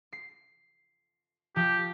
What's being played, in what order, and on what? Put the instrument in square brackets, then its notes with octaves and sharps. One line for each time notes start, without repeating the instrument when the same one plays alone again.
[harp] C7
[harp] F3 [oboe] G4